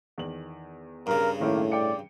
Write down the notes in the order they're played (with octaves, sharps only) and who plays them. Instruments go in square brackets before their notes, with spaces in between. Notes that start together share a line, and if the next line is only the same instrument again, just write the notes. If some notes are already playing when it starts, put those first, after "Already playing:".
[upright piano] E2 D#3 F#7
[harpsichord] G2 C#3 [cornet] A#4
[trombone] A2 [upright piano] D#3 C#4 E4 [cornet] A#3
[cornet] D5 [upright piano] G5 C#7